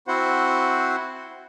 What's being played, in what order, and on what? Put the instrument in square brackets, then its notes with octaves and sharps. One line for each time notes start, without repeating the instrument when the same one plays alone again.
[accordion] C4 E4 F#4 C5 F#5